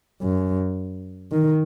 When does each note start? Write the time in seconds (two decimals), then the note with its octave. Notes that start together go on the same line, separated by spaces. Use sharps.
0.22 F#2
1.32 D#3